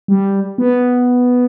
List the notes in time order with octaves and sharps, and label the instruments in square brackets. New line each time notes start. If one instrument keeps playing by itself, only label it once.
[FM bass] G3
B3